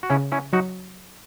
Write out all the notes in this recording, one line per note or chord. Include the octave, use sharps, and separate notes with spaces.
F#4
C#3 C#4 E4
C#4 E4
F#3 D#4 F#4